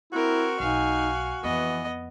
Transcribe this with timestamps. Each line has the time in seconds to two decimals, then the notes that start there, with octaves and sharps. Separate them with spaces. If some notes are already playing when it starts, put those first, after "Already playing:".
0.13 C4 E4 F#4 A#4
0.60 B1 D#4 F5 G#5
1.43 F2 E3 B3 D#5